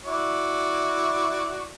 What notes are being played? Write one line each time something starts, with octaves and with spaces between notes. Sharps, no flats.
E4 F#4 D5